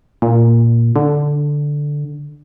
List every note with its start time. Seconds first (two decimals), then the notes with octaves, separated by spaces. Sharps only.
0.22 A#2
0.96 D3